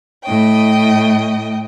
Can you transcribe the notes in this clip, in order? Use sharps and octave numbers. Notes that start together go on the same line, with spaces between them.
A2 D#5 G5